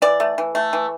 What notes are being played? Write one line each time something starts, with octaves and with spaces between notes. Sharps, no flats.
E3 D5
A3
E3
A3
E3